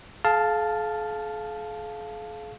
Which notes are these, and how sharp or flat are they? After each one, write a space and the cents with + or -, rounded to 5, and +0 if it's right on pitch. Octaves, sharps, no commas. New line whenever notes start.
G#4 +45 F5 +0 A5 +0